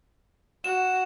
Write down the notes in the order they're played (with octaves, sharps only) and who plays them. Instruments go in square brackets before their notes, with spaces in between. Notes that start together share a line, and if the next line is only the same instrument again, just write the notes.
[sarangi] F#4 [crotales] E7